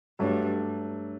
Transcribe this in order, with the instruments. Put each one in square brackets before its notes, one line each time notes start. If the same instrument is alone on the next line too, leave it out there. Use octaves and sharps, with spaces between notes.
[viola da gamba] G2 [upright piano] F#3 A3 D4